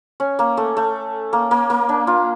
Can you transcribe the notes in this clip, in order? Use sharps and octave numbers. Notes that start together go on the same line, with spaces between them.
C#4
A#3
A3
A3
A#3
A#3
A#3
D4
F4